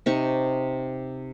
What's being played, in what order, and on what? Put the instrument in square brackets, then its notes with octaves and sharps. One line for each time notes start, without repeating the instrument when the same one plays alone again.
[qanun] C3 D#4 C#6